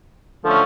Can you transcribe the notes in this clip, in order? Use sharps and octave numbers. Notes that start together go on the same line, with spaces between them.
D3 F3 A3 C#4